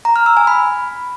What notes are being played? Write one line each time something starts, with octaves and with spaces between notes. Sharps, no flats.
A#5
F6
E6
G#5
B5